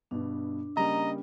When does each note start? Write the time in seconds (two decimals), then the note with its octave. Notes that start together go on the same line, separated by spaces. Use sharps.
0.11 G2 B2 D4
0.77 C#3 G3 A#3 D#5 A#5